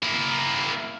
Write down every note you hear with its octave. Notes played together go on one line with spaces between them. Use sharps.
A#3 E4